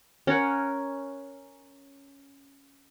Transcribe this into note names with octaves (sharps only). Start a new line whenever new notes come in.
C#4 A#4 C#5 F#5